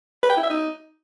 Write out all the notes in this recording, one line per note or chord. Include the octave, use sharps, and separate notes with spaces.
B4
G5
E4
E5
D#4